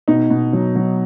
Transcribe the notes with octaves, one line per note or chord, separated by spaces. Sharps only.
B2 D#4
B2
F#3
F#3